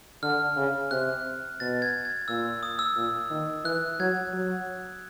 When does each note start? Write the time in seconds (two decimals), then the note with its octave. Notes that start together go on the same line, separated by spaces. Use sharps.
0.23 D3 F6
0.57 C#3
0.91 C3 F#6
1.60 B2 A6
1.82 G#6
2.05 G#6
2.28 A#2 E6
2.63 D#6
2.79 E6
2.96 A#2
3.30 D#3
3.64 E3 F#6
4.00 F#3 G#6
4.33 F#3